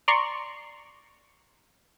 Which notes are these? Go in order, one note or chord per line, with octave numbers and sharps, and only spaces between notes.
D5 A#5 C6 C#6